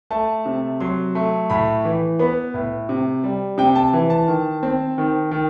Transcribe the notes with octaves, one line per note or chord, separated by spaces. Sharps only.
A3 A5
C3
F#3 C6
A3
A2 B5
E3
B3 B5
A2
C3
G3
C3 G5
G5
A5
E3
A5
D#3
C4
D#3
D#3